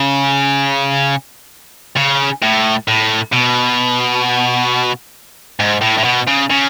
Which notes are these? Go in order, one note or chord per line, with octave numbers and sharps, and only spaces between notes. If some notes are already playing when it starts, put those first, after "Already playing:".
Already playing: C#3
C#3
A2
A2
B2
G#2
A2
A2
B2
C#3
C#3